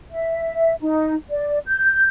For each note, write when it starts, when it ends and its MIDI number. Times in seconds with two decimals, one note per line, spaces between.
0.10 0.74 76
0.81 1.14 63
1.30 1.58 74
1.66 2.08 91